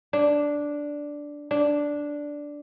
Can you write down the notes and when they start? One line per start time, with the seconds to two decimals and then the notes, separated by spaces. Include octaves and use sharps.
0.13 D4
1.51 D4